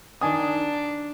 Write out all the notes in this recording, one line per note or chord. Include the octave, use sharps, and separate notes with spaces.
D#3 D4 G#5 D#6